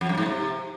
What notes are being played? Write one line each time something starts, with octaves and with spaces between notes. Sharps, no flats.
F2
F#2
G#2
C3